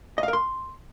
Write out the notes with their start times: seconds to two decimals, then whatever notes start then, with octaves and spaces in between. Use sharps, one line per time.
0.18 D#5
0.23 F5
0.28 A#4
0.33 C6